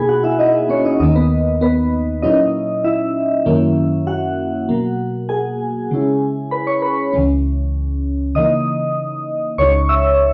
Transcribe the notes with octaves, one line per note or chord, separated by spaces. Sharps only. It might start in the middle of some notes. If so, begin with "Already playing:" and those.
Already playing: B2 A#3 D#4 G#4 G#5 B5
F#4 F#5
E4 E5
D#4 D#5
C#4 C#5
D#4 D#5
D#2 D#3 A#3 D#4 D#5
B3 B4
B3 B4
A#2 F#3 C#4 D#4 E4 D#5
E4 E5
F#2 D#3 F#3 A#3 C#4
F#4 F#5
B2 F#3 A#3
G#4 G#5
C#3 G#3 C#4 E4
B4 B5
C#5 C#6
B4 B5
C#2 C#3 E3 G#3 C#4
C#3 E3 A#3 D#4 D#5 D#6
C#2 C#3 G#3 D#4 C#5 C#6
E5 E6